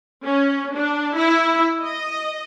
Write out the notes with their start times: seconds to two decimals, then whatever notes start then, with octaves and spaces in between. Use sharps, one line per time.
0.24 C#4
0.77 D4
1.17 E4
1.83 D#5